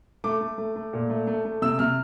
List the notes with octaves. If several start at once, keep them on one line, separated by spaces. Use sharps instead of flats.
A3 D6
A3
A3
A3
A#2
A3
A3
A3
C3 E6
C3 F6